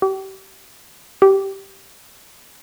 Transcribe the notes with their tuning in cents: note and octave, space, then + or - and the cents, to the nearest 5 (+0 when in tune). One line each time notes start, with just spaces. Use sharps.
G4 -30
G4 -10